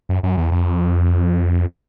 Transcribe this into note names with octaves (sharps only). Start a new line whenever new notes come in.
F#2
F#2
E2
F2